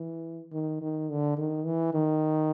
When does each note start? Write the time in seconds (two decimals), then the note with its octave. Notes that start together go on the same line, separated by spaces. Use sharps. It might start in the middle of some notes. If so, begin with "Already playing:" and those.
Already playing: E3
0.52 D#3
0.81 D#3
1.10 D3
1.38 D#3
1.66 E3
1.93 D#3